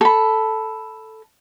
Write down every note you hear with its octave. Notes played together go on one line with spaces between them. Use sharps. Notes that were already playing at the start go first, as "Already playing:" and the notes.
A4 B5